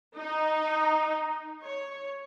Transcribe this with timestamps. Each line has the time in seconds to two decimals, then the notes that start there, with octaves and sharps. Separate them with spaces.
0.16 D#4
1.63 C#5